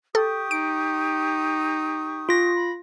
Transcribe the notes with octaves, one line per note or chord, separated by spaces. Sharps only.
G4 A4 C#6 D#6
D#4 D7
F4 A#6
B5